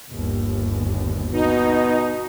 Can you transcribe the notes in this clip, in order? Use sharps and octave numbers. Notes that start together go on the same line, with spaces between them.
G1 D#2
B2 D#4